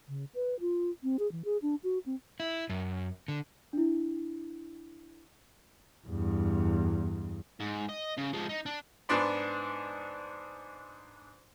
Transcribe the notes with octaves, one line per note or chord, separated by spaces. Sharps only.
C#3
B4
F4
C4
G#4
E3
G#4
D4
F#4
C4
E4
F#2
D3
D4 E4
E2 G2
G#2
D#5
C#3
F3 G#3
D#4
D4
G#2 B3 D4 D5 C6